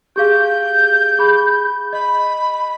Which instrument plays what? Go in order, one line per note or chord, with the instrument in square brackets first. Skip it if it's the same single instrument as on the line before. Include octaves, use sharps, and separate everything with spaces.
[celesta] G4 G#4 F5 [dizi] G6
[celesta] G#4 B5
[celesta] D#5 [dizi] B5